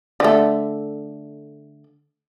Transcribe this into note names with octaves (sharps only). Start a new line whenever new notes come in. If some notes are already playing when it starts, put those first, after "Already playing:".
D3 A3